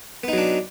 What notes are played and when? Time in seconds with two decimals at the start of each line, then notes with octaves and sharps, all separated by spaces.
0.24 B3
0.28 D#4
0.33 F#3
0.38 D4